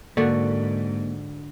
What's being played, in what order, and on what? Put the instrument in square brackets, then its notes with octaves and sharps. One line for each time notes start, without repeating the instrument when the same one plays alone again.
[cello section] G#2 [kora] D3 F#4 [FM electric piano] A#3